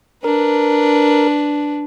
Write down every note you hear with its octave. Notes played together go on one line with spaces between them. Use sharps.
D4 A#4 B4